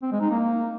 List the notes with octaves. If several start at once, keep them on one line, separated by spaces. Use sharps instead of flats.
C4
G#3
D#4
A#3